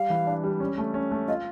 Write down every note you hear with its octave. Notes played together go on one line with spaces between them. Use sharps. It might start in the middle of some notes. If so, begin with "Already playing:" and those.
Already playing: G3 F5
E3
D4
G3
C#4
A3
C#4
A3
F4 D#5